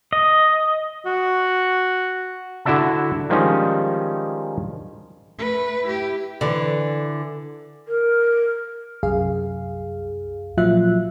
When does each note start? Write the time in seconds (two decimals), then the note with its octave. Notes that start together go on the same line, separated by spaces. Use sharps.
0.13 D#5
1.06 F#4
2.65 D3 E4 F#4 D5 E5 A5
3.30 D#3 F3 G3 G#3 C#4 D#4
5.39 A3 B4
5.86 E4 G4
6.41 D3 E3
7.88 A#4
9.03 C2 F#2 G#4 F5
10.57 A#2 F3 F#3 F4 E5 F#6